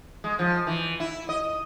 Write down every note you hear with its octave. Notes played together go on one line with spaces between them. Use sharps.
G#3
F3
E3
E4
D#5